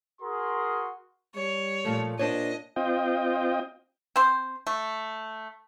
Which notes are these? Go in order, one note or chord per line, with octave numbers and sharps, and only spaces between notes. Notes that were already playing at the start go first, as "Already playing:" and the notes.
F#4 G#4 A#4 C6
G3 C#5
A#2 F3 A3
A#2 D4 C5 C#5 D#5
C4 F4 D#5 G5
C4 C5
A3